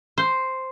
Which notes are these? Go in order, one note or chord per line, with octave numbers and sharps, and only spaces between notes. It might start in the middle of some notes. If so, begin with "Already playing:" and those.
C5